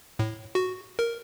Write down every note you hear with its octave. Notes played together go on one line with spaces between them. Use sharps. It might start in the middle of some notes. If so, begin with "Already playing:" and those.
A2
F#4
A#4